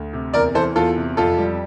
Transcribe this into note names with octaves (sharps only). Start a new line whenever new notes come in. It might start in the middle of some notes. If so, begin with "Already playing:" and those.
Already playing: D2
C3
E2 A#4 D5
E3 A4 C5
E2 F4 A4
C3
F2 F4 A4
G3